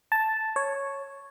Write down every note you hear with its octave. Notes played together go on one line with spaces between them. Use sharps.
A5
C#5